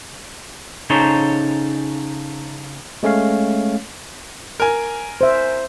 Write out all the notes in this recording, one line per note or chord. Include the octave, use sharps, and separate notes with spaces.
C#3 D#4 A4 C5 C#5 A#5
G#3 A3 C#4 C#5 F5
A#4 G#5
C5 E5